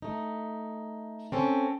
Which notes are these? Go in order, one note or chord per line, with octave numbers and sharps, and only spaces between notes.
A3 D#4
C4 C#4 A4